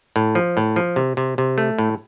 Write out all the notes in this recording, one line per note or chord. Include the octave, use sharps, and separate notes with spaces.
A2
F3
A2
F3
C3
C3
C3
A3
A2